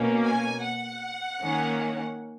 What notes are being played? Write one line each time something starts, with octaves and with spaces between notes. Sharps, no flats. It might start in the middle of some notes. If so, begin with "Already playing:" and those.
Already playing: B2 A#3 C#4
G#5
F#5
D#3 A#3 C#4